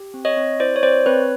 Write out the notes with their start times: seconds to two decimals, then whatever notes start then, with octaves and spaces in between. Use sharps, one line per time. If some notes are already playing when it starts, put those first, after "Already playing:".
Already playing: G4
0.14 C4
0.25 C#5 D#5
0.37 C4
0.60 E4 C5 D5
0.76 C#5
0.83 C4 C5 D5
1.06 C4 B4 C#5